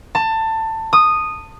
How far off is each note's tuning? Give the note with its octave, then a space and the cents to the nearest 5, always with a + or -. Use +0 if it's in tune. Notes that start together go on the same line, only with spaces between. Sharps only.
A5 +20
D#6 -10